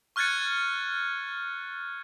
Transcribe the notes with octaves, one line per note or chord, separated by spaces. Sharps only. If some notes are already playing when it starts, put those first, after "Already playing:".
C#6 F6 F#6 G#6 A6 C#7